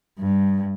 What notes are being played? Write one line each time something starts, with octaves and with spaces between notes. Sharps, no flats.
G2